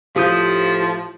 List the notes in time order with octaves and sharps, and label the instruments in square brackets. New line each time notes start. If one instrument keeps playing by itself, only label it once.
[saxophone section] A2 F3 [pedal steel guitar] G4 D#6 G6